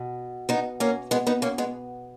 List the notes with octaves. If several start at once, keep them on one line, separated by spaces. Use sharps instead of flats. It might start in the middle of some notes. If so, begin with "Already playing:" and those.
Already playing: B2
B3 D#4
A#3 C#4
G#3 B3
B3 D#4
A#3 C#4
G#3 B3